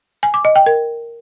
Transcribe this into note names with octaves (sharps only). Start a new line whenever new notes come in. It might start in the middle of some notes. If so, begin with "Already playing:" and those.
G#5
D6
D#5
G5
A#4